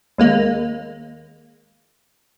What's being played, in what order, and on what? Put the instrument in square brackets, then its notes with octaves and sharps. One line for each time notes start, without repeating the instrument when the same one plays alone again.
[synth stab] D#2 G#3 A#3